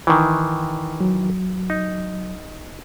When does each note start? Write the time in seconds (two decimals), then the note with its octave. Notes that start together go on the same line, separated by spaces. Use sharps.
0.07 D#3 E3
1.00 F#3
1.70 D#4